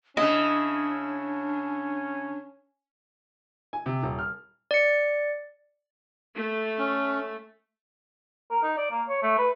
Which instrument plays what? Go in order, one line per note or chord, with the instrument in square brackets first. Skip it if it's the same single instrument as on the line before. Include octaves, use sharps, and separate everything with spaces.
[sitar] C#3 E4 [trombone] C#4 [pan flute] D4 [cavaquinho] D#5
[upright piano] G#5
C3
D#1
F6
[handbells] D5 C#7
[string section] A3
[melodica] C#4
[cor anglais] A#4
D#4
D5
A#3
C#5
A3
B4